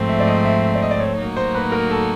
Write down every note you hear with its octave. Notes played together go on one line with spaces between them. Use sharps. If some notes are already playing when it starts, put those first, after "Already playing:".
Already playing: G#2 F3 A3 C4
E5
D5
D#5
E5
E5
D5
D#5
D5
C#5
A2 F#3 A#3 D#4 F#4
C5
B4
A#4
A4